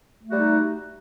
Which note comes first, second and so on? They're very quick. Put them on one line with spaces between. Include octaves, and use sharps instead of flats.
A3 F#4 G3 D#4